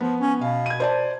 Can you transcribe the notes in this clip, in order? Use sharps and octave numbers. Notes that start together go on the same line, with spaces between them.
F3 B3
C#4
B2 F5
G#6 D#7
C5 D5 A5